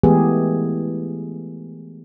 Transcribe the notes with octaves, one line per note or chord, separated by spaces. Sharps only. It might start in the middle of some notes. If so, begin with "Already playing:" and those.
E3 G#3 A3 B3 G4 G#4